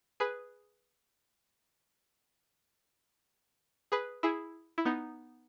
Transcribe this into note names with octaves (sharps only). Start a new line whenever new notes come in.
G#4 B4
G#4 B4
E4 G#4
E4
B3 D#4